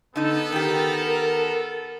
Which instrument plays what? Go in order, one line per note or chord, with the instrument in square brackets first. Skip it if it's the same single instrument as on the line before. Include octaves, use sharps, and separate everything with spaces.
[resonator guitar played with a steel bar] D3 D#4 [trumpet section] B3 A4
[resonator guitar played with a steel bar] D#3 G4 [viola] A#4